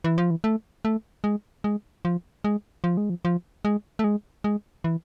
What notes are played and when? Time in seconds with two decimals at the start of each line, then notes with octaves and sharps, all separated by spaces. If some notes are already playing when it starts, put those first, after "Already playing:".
0.04 E3
0.18 F3
0.31 E3
0.44 A3
0.85 A3
1.24 G#3
1.64 G#3
2.05 F3
2.44 G#3
2.84 F3
2.97 G#3
3.10 F3
3.25 F3
3.65 G#3
3.99 A3
4.04 G#3
4.44 G#3
4.84 E3